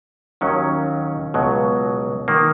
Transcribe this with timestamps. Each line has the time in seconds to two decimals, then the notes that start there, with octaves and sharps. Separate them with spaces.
0.41 D#2 D#3 F#3 C#4
1.34 C#2 B2 F#3
2.28 D#3 A#3